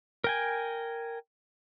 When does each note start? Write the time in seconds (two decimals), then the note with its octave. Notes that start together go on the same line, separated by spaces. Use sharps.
0.24 A#4 G5 G#5